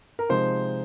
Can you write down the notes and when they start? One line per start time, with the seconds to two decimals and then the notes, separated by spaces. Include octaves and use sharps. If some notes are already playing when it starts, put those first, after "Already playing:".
0.19 A#4
0.29 C3 F3 G#3 D#4 C5